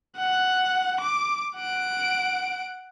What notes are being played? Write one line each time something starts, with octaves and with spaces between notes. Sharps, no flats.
F#5
D6
F#5 D7